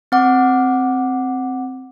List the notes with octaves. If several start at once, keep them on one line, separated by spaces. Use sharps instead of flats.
C4 F#5 D6